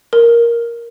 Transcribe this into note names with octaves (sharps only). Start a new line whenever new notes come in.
A#4